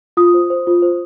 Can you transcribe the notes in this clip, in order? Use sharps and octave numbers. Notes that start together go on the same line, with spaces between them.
F4 D#6
C5
C5
F4
C5